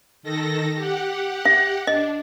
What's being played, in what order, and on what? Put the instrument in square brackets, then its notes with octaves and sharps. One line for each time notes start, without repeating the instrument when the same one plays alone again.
[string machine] D#3 A4 A#6
G4 F#5
[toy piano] E5
[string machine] D4 [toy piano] D#5